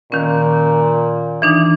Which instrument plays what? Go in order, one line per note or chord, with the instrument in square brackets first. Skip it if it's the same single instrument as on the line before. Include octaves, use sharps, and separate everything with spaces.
[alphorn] A#2 [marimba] D#3 C#4
[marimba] E3 D4 D#4